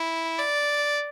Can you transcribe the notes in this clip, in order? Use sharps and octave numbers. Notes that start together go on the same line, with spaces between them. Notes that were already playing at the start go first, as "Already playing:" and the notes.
Already playing: E4
D5